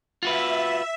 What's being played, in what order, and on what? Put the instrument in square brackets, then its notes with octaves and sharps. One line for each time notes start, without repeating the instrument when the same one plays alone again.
[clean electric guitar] F4 F#4 B4 [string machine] E5